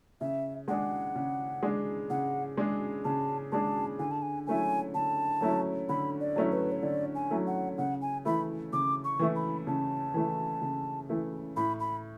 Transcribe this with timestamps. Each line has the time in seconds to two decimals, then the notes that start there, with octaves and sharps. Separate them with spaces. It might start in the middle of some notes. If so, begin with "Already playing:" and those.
0.21 C#3 E5
0.68 G#3 D4 G#4 F#5
1.16 C#3
1.63 G#3 D4 G#4
2.10 C#3 F#5
2.57 G#3 D4 G#4
3.04 C#3 A5
3.52 G#3 D4 G#4 A5
3.99 D3 G#5
4.11 A5
4.22 G#5
4.47 F#3 A3 C#4 E4 G#5
4.94 D3 A5
5.41 F#3 A3 C#4 E4
5.89 D3 B5
6.21 D5
6.36 F#3 A3 C#4 E4
6.52 B4
6.72 C#5
6.83 D3 D5
7.15 G#5
7.30 F#3 A3 C#4 E4
7.47 F#5
7.78 C#3 F#5
8.02 G#5
8.25 E3 A3 E4 B5
8.73 C#3 D6
9.04 C#6
9.19 E3 A3 E4
9.36 B5
9.67 C#3 A5
10.14 E3 A3 E4
10.62 C#3
11.09 E3 A3 E4
11.57 A2 B5
11.80 B5